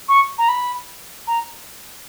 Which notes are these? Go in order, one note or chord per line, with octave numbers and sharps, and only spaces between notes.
C#6
A#5
B5
A#5